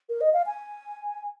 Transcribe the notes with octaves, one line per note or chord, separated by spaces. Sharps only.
A#4
D#5
F5
G#5